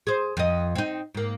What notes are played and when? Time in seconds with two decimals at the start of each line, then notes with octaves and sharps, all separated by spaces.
0.07 G#4 C5
0.37 F2 D#5
0.75 C4 D#4
1.14 G#2 A#3